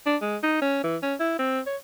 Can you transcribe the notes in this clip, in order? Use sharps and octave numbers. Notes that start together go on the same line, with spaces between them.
D4
G#3
D#4
C#4
E3
C#4
E4
C4
C#5